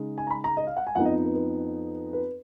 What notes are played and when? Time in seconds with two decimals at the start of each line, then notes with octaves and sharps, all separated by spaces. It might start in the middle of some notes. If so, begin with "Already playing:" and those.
Already playing: C#3 G#3 D#4
0.18 G#5
0.27 A#5
0.30 B5
0.44 A#5
0.57 D#5
0.67 F5
0.77 F#5
0.87 G#5
0.95 F2 F3 B3 D#4 F#5
1.05 D#5
1.25 B4
1.35 B4
2.13 B4